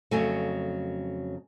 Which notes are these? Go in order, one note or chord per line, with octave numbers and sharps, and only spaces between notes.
F2 C#3 F#3 A3 G#5